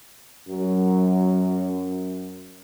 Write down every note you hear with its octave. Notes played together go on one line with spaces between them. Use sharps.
F#2 F#3